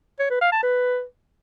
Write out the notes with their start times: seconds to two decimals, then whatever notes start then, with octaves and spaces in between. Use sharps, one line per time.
0.20 C#5
0.31 B4
0.41 F5
0.52 A5
0.63 B4